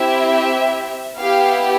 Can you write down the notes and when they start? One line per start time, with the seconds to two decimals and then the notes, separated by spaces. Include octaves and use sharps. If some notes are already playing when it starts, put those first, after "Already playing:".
Already playing: C4 E4 G4 E5
1.18 B3 E4 G4 F5